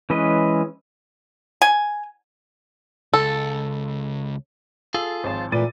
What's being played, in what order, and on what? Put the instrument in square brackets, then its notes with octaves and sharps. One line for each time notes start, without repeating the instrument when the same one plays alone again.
[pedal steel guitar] E3 G#3 C#4 B4 D#5
[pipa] G#5
[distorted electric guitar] C#2 [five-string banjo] A4
[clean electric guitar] F4 G#4 [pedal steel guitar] A4 [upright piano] E6
[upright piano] G#1 F3 C#5 [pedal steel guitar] C5 A5
[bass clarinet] A#2 [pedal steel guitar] E3 A3 B4 [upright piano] D6 A6 D#7